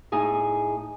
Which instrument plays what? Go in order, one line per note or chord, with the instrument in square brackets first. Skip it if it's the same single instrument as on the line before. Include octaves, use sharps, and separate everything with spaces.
[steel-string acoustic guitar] A2 D#4 G#4 G#5